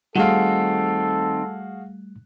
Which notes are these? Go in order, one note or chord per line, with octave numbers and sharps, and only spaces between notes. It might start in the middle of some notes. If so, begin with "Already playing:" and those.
D#3 G3 A3 C4 F#4 G#4 A4 F5